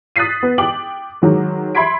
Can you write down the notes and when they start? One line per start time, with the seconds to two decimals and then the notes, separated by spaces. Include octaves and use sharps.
0.16 D#6 F#6 A6 B6 C7 D#7
0.43 B3
0.58 G5 D6 F#7
1.22 D#3 F#3 G#3
1.75 E5 B5 C6 G#6 B6 D7